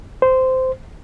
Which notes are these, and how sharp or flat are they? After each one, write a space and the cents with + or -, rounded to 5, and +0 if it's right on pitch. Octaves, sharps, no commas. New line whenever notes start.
C5 -15